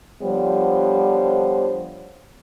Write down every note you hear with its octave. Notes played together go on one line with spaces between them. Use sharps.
D3 F3 G3 B3 C5 C#5